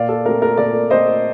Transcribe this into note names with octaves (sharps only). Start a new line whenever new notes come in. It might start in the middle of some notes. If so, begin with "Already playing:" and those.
Already playing: A#2 D5 F5
A4
A3 C4 A#4
A#4
A#2 A#4 D5
A3 C4 C5 D#5